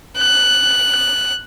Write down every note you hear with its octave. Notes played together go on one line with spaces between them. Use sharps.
F#6